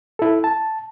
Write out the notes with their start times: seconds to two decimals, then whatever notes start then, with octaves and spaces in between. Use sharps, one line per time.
0.19 E4 A4
0.44 A5